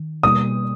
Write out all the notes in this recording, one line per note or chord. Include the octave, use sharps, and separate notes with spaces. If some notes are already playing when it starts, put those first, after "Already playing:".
Already playing: D#3
B2 G3 A#3 D#6